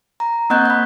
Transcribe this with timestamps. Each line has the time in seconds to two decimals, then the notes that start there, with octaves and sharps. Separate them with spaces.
0.20 A#5
0.50 A#3 C4 D#5 F#5 F#6 G6
0.65 B5 G6